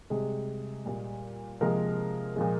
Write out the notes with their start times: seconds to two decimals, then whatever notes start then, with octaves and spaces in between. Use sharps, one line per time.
0.10 C3 G3 G#3 G#4
0.86 A#2 G3
1.61 C3 F3 G#3 A#3 A#4
2.36 A#2 F3 G#3